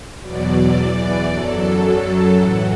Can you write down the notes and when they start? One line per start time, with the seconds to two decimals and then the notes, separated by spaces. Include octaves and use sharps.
0.20 E2 B2 F#3 D5
0.74 E2 E3
1.27 F#2 F#3 A4
1.81 F#2 F#3
2.34 A2 E3 F#4